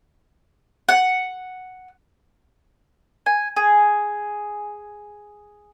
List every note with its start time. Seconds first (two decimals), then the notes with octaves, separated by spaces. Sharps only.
0.89 F#5
3.26 G#5
3.56 G#4